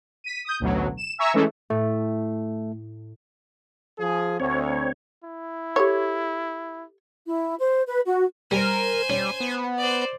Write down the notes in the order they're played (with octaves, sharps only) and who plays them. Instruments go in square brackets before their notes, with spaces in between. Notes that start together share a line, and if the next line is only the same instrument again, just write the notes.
[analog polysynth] B6 D#7
D#6 G6
A1 D2 B2 F#3
E7
E5 G#5 A#5 C#6 E6
E3 G#3 A3 C#4 A4
[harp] A2 [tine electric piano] A3
[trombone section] F3 G#4
[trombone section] D2 [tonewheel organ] C4 C#5
[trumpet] E4
[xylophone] G4 A4 [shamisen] C#5
[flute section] E4
C5
B4
F#4
[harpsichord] G3 [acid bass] A#4 [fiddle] C5 G#5
[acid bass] G3 [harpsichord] C#4
[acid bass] B3
[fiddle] C5 D5